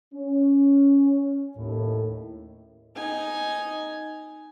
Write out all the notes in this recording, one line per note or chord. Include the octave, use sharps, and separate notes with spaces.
C#4
D#2 A2
D#4 G#5